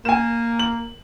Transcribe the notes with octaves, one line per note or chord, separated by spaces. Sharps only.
A#3 G#5 E7
F#7